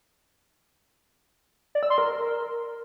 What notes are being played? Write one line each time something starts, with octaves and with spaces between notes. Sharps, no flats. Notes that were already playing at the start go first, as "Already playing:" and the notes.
D5
E6
C6
A#4